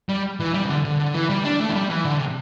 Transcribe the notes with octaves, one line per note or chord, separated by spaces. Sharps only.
G3
E3
G3
C3
D3
D3
D3
E3
G3
D4
A3
E3
G3
E3
D3
C3